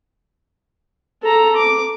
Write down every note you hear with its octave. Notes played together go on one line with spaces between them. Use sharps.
A4 A#5
D6